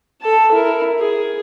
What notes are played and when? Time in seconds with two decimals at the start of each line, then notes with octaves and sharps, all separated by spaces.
0.22 A4 A5
0.51 E4 A#4
0.98 G#4